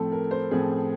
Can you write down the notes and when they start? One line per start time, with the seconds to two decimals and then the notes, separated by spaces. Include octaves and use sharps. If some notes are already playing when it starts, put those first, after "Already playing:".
Already playing: A2 F3 A3 C4 A4
0.12 A#4
0.31 C5
0.51 A2 F3 A3 C4 G#4